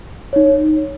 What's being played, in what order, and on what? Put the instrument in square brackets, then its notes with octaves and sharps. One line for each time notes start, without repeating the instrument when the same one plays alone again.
[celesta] D#4 C#5